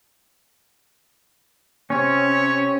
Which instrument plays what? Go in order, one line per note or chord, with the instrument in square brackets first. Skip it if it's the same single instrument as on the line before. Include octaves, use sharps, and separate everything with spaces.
[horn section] C3 C4 C#5 [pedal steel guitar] C#4